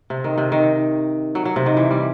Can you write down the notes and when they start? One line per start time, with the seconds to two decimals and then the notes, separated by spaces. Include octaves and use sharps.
0.10 C3
0.24 D#3
0.38 C3
0.52 D#3
1.35 F#3
1.45 F#3
1.56 C3
1.66 D#3
1.77 E3
1.91 G3